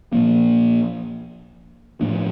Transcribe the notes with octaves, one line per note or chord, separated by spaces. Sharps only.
A#2 F3 A#3
A2 F3 A3 D4